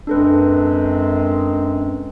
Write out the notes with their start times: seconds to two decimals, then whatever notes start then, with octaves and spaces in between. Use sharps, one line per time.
0.07 F#2 G#3 C4 D4 A4 B4